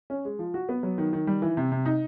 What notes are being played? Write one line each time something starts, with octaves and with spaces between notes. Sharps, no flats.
C#4
G#3
F3
F#4
B3
F#3
D#3
D#3
G3
E3
C3
C3
D#4